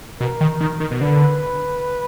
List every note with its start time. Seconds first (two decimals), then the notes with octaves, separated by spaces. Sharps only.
0.21 B2 A#4
0.41 D#3
0.60 D#3
0.80 D#3
0.91 B2
1.01 D3 B4